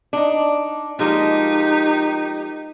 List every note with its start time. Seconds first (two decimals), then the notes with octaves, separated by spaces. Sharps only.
0.13 D4 D#4
0.99 F3 G#3 A#3 D#4 G4